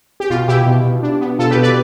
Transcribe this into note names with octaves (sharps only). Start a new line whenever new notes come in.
G4
B2 F4
B2 E4 G4
B2
B2
D4
B3
B2 F4 A4
G4 B4
B2
B4 D5